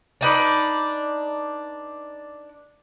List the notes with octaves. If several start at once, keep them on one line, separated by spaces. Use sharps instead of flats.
D4 D#4 B4 D5